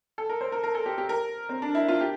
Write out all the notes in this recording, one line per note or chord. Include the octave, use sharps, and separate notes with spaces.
A4
A#4
C5
A#4
A#4
A4
G4
G4
A#4
C4
D4
E4
F4
G4